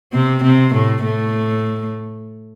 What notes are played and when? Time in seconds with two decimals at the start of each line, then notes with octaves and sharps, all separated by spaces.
0.13 C3 C4
0.43 C3 C4
0.74 A2 A3
1.04 A2 A3